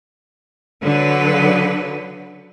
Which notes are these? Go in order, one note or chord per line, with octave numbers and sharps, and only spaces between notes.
D3 F#3 B4